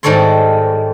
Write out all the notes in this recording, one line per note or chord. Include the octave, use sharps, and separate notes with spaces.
G#2 D#3 G3 A4 C#5 C6